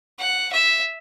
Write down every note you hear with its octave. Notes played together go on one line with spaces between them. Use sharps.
F#5
E5